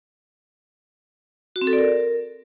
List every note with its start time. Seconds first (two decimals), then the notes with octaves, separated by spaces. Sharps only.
1.56 F#4
1.61 C4
1.67 A4
1.73 D5
1.79 A#4